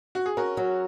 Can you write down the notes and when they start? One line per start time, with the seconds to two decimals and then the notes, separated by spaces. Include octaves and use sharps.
0.15 F#4
0.26 G#4
0.37 C#4 F#4 A#4
0.57 F#3